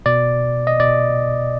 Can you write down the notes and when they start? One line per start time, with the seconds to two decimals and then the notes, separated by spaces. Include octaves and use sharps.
0.06 B2 D5
0.67 D#5
0.80 B2 D5